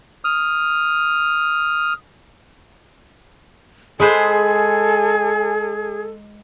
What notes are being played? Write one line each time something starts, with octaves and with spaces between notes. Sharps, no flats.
D#6 F6
G#3 G#4 A4 B4 C5 G#5